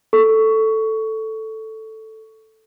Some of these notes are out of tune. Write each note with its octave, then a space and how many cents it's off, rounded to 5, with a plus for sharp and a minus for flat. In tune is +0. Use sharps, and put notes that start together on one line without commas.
A4 +0 C#6 +15